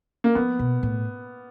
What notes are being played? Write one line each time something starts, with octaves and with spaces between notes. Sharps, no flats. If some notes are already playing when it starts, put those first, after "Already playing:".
A#3
F3 B3
B2
A2